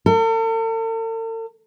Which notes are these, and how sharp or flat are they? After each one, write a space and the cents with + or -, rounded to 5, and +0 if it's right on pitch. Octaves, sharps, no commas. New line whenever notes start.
A4 +45